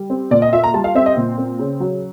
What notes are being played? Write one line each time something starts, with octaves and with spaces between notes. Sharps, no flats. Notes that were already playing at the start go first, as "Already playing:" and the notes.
Already playing: G3
C4
A#2 D5
D#5
F4 E5
A#5
G3 A5
F5
C4 E5
D#5
A#2
C4
C#3
F#3